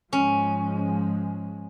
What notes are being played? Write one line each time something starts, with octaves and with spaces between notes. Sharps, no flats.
G#2 F3 G#3 C#4